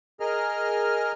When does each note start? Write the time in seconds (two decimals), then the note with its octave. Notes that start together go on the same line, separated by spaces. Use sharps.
0.20 G#4 A#4 D#5 F6